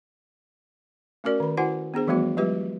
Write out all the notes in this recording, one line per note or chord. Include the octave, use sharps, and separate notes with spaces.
A3 C#4 F#4 A#4 D5
D#3 B5
E4 F#4 C5 F#5 G#5
B3 D4 G#4 C5
E3 F3 G3 A3 B3 F#4
F#3 G#3 F4 G4 B4 E5